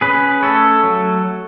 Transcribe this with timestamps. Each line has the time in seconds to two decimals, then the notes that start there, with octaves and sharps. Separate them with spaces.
0.01 C#4 G#4 B4
0.42 A3 A4 C#5
0.84 F#3